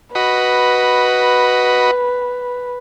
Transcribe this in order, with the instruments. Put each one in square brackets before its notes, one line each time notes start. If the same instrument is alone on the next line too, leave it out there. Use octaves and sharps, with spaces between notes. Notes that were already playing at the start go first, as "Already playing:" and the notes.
[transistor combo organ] F#4 D#5 B5 [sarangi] B4